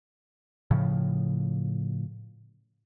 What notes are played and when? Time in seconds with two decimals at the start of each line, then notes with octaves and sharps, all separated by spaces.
0.71 A2 C#3 F3